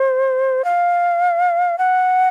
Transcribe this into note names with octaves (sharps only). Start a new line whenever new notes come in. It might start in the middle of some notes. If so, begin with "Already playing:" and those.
Already playing: C5
F5
F#5